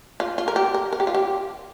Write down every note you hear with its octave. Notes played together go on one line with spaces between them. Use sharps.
F4
F4
A#4
G4
A#4
A#4
G4
F4
G4